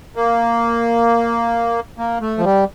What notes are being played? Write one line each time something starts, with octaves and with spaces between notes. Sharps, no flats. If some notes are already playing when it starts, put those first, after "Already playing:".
A#3
A#3
A3
F3
G3